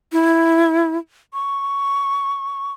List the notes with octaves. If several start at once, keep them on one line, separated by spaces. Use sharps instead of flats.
E4
C#6